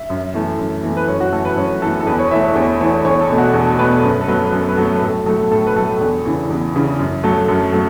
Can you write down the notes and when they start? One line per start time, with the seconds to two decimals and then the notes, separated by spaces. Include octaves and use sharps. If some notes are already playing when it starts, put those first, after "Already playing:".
Already playing: E5
0.10 F#2
0.34 E3 A3
0.59 F#2
0.83 E3 A3
0.97 B4
1.08 F#2 C#5
1.20 F#4
1.32 E3 A3 A4
1.45 B4
1.57 F#2 C#5
1.82 E3 A3 A4
2.00 A4
2.07 E2 B4
2.19 C#5
2.31 E3 A3 E5
2.44 C#5
2.55 E2 C#5
2.80 E3 A3 C#5
3.05 E2 C#5
3.21 A4
3.30 B2 A3
3.38 F#4
3.54 E2 A4
3.67 A4
3.79 B2 A3 B4
3.91 A4
4.03 F#2 B4
4.21 A4
4.28 F#3 A3 B4
4.46 B4
4.53 F#2 A4
4.68 B4
4.77 F#3 A3 A4
4.98 B4
5.02 A2 A4
5.26 F#3 A3 A4
5.51 A2 A4
5.67 B4
5.76 F#3 A3 A4
6.00 E2
6.25 C#3 E3
6.50 E2
6.74 C#3 E3
6.99 F#2
7.23 F#3 A3 A4
7.48 F#2 A4
7.73 F#3 A3 A4